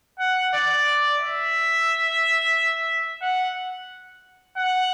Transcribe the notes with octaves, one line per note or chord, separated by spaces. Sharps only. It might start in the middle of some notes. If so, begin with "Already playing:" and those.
F#5
D5
E5
F#5
F#5